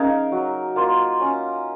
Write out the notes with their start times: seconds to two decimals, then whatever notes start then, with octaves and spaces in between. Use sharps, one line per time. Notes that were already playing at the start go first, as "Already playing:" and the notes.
Already playing: C#3 D#4 A#4 F5
0.32 F#3
0.76 A#3 F4 C5
1.21 C#4